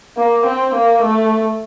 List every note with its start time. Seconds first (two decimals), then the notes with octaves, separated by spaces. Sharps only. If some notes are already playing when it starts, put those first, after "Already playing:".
0.17 A#3
0.46 C4
0.74 A#3
1.02 A3